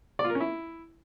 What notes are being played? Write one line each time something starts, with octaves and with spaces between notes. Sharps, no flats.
D5
F4
A#4
C#4
E4